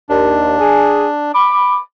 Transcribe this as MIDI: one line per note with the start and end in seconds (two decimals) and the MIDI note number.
0.09 0.56 39
0.09 1.32 62
0.60 1.06 68
1.34 1.78 83
1.34 1.78 86